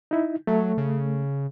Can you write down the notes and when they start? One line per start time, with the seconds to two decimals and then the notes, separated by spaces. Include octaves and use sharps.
0.11 D#4 E4
0.47 F#3 A3
0.77 C#3